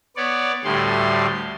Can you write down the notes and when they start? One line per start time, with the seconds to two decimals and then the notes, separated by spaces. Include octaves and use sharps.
0.16 B3 C#5 D5
0.64 D2 A2 G3 C6